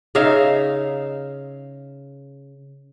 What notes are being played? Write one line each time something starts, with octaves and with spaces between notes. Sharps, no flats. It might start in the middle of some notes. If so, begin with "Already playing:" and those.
C#3 D#4 E5 F5